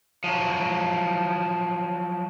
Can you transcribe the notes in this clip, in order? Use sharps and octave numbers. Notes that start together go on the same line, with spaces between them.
F3 F#3